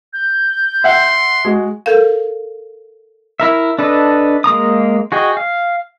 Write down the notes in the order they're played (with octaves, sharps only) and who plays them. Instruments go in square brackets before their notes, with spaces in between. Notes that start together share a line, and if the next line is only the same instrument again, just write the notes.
[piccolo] G6
[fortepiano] E5 F#5 [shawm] C6
[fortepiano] G#3 F#4
[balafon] A4 A#4 F5
[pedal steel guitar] E4 A#4 E5
D4 A4 B4 D#5
G#3 A#3 A#5 D#6
F#4 G#4 D#5 G5
F5